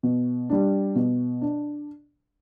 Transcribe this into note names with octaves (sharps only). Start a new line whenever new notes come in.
B2
G3 D4
B2
D4